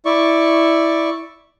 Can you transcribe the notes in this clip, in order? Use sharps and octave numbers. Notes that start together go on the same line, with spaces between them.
E4 D5 C#6